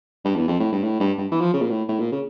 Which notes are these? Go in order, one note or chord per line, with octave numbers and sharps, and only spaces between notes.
G2
E2
F2
A2
G2
A2
G2
G2
E3
F3
C#3
A#2
A2
A2
A#2
C#3